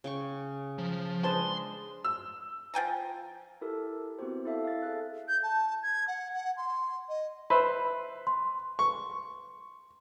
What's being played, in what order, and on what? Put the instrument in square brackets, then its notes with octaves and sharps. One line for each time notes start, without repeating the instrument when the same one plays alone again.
[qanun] C#3 G5 C#6
[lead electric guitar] F3
[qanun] G#3 D4 D#5 [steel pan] B4 C5 A5 [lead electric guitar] C6
[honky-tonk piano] E6
[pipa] F3 G5 G#5 A#5
[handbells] E4 G4 A4 A#4
B3 C4 E4 F#4 G4 C5
E4 A4 E5 F5
F5 A6
G#4 A4 E5 F#6
[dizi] G6
A5
G#6
F#5
F#5
C6
D#5
[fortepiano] B4 C5 E5 [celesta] B5
[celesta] C6
[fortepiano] C#6